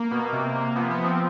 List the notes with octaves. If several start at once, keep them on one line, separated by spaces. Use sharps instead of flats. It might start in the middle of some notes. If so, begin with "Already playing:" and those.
Already playing: A#3
B2
C3
C3
F3 B3
B3
F3
C4